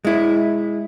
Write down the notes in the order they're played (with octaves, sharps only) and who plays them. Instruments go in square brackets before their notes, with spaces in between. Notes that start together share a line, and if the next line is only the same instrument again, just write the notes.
[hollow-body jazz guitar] G#3 E4